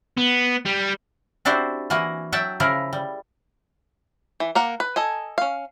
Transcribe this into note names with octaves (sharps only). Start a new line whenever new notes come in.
B3
G3
C4 D4 E4 F#4 G4 C5
E3 A#3 F#4 F#5 G#5
F#3 E5 F#5 G5 A5
C#3 F3 E4 A#4
G3
E3
A#3 A#4 F#5
B4
A4 D#5 G#5
C#4 F5